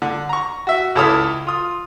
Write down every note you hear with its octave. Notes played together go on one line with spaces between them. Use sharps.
D3
A#5 C#6
F#4 E5
C#2 E4 A4 C#5 D#6 F6
F4 D#6